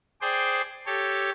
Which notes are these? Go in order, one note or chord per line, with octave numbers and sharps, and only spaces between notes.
G#4 C5 D5 G5
G4 A4 C#5